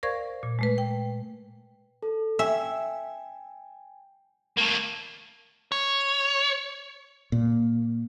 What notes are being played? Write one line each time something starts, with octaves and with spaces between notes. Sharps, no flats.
A#4 C5 D5 F5 C#6 G#6
A#2
G#3 A3 B4
G5
A4
E5 G5 G#5
A3 A#3
C#5
A#2